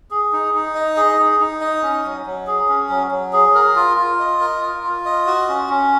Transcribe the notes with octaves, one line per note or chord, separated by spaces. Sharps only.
G#4
D#4
D#4
D#5
G#4
D#4
D#4
D#5
C#4
F#3
F#3
G#4
C#4
F#3
F#3
G#4
A#4
F4
F4
D#5
A#4
F4
F4
D#5
F#4
C#4
C#4